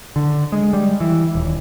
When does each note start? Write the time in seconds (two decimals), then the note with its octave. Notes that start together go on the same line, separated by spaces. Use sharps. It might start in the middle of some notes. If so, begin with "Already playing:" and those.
0.16 D3
0.52 G#3
0.73 G3
1.00 E3
1.35 D#1